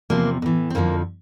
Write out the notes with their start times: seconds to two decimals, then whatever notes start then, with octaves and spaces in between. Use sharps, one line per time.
0.10 E2 C3 F3 A#3
0.42 A2 E3
0.70 C4
0.75 F2 D3 F3 A#3